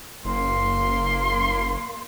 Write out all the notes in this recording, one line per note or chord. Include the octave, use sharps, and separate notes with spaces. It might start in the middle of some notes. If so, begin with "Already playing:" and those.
F#1 A#3 C6